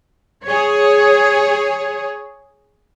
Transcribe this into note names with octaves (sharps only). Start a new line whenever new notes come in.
G#4 C#5